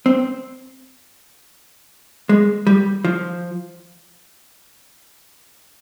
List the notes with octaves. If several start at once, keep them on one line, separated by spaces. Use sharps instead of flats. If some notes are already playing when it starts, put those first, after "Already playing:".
C4
G#3
G3
F3